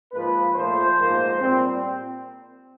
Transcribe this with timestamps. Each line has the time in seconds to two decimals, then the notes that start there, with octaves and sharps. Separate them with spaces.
0.12 G#2 F3 A#3 B4
0.55 A#2 F3 A3 C5
0.97 G#2 F3 A#3
1.39 A#2 G3 C4